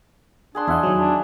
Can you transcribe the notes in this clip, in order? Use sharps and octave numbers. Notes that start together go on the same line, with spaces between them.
D4 G#4 F#5 C6
E2 E4 D#5 F#5
D#3 F#3
D4